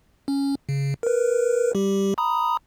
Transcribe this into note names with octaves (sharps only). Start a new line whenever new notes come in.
C#4
C#3
A#4 B4
G3 G4
A#5 B5 D#6